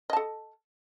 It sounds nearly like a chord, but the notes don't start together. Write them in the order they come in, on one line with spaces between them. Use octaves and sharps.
D#5 A5 A4